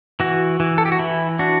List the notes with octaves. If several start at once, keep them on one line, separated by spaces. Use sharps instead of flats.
E3 F#4
E3
A4
G4
F#4
E3 E4
D4 F#4